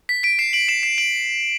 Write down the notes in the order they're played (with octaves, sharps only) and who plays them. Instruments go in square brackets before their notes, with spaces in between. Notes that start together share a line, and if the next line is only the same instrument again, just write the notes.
[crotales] B6
B6 D7
C7 E7
D7 F#7
C7 E7
C7 E7
D7 F#7